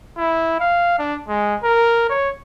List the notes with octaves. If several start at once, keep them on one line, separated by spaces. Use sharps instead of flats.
E4
F5
D4
G#3
A#4
C#5